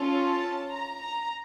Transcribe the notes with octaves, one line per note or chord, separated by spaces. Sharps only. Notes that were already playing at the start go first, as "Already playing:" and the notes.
Already playing: C#4 F4 A4
A5
A#5
A#5